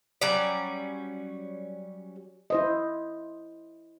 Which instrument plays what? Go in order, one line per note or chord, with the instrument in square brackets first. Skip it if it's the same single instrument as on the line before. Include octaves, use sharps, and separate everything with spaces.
[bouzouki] F#3 G3 C#4 D5
[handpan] E4 C5 D#5